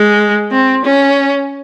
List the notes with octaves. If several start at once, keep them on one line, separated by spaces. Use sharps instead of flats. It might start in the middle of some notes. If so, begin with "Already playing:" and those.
Already playing: G#3
C4
C#4